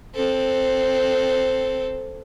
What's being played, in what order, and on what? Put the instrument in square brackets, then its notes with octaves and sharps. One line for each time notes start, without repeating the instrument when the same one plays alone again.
[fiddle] C4 A4